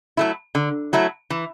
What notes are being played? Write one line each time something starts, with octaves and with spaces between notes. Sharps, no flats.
F#3 A3 E4
D3
F#3 A3 E4
E3